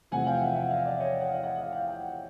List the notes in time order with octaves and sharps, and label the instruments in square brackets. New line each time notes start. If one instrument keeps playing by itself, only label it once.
[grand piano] E2 C3 F3 A3 C4 F#5 G#5
F5 G5
E5 F#5
E5 F#5
D#5 F5
D5 E5
C#5 D#5
F#5
D#5 F5
E5 F#5
D#5 F5
F5 G5
F5 G5